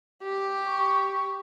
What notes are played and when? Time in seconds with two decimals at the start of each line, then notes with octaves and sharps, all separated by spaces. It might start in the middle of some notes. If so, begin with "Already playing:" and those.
0.23 G4
0.66 C#6